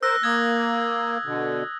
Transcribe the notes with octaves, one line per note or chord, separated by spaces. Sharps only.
A#4 C5 E6 F#6 A#6
A#3 D#6 G#6
B2 D3